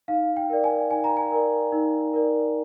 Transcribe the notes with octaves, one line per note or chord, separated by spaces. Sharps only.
D#4 F5
G5
A#4 D5
G#5
D#4 G#5
A#5
G#5
A#4 D5
D#4
A#4 D5